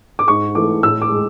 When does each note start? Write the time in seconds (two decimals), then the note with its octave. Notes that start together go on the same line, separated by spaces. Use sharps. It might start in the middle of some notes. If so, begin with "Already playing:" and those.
0.19 D6
0.28 G#2 C#6
0.55 E3 A3 D6
0.83 A2 E6
1.02 D6
1.11 G#3